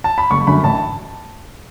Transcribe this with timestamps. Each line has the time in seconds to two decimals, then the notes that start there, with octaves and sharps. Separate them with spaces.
0.04 A5
0.18 B5
0.31 F#1 C#6
0.47 F#2 D3 B5
0.64 A1 A5